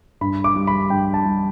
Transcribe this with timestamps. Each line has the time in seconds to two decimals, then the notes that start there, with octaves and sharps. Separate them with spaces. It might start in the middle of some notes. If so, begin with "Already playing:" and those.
0.21 G2 B5
0.44 D6
0.56 G3
0.67 B5
0.90 G2 G5
1.14 A5
1.26 G3